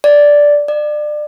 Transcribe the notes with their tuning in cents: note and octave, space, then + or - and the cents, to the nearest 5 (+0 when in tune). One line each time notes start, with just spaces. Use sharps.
D5 -5
D5 +30